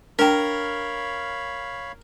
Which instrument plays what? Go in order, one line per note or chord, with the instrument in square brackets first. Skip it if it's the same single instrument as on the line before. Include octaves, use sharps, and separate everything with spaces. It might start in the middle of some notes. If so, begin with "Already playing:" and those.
[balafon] D4 G5 [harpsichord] A#4 [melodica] C#5 F5 B5